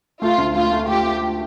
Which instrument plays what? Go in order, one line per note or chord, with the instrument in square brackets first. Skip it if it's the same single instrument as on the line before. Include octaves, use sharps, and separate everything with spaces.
[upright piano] A3 [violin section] F4
[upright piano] D2
[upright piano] A3 [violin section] F4
[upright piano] A3
[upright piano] F4 [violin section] G4
[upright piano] A3